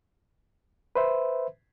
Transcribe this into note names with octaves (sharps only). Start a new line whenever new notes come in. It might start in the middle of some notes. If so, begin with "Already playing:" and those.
B4 C5 E5